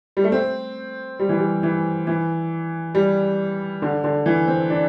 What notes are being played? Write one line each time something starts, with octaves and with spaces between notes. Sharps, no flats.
G3
A3
C4
G3
E3
G3
E3
E3
G3
D3
D3
E3
C4
D4